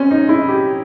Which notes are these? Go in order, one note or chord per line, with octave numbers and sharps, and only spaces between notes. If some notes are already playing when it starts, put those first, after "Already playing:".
Already playing: C4 C#4
D#4
E4
G4